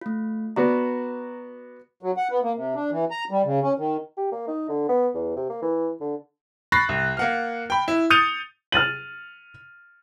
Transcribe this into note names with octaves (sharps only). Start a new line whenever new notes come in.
A3 F4
B3 F#4 D5 A#5
F#3
F#5
B3
A#3
C3
D4
E3
A#5
G3
C#3
C#4
D#3
G4
A#3
D#4
D3
B3
E2
C3
A#3
E3
D3
B5 C#6 F#6 A6 A#6 C7
C2
A#3 F#5 F6
G5 B5
E4
D#6 G6 A6 C#7 D#7 F7
F6 A6 D#7 F#7